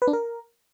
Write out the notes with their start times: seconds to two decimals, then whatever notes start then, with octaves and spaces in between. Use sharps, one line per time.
0.02 B4
0.07 D4
0.13 A#4